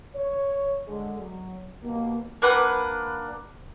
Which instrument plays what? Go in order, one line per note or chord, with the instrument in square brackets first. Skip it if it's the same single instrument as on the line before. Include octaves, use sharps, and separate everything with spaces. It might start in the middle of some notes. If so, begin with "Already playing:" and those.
[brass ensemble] C#5
D3 G#3
F#3
D#2 B2 A#3
[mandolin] A#3 D4 B4 F#5